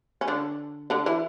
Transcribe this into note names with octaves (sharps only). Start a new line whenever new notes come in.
C#4
D3 D4
D3 D4
E3 E4